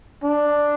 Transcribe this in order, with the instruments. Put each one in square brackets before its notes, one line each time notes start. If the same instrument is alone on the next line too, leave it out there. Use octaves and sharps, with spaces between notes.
[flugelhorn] D4